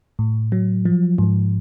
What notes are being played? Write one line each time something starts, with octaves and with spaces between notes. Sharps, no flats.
A2
F#3
F3
G#2